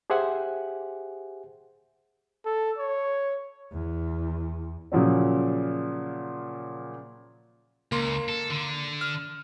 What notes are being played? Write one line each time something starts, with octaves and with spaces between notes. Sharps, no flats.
G4 G#4 C5 E5 F#5 G#5
A4
C#5
E2
A#2 C#3 F3 F#3 C#4
C#2 A#3 C6
A4
D3
F6